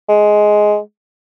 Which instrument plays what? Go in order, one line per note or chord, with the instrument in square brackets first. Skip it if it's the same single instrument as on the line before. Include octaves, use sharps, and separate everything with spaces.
[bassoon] G#3